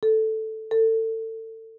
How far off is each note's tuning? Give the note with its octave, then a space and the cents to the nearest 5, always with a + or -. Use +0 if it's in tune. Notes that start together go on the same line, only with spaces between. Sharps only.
A4 +0
A4 +25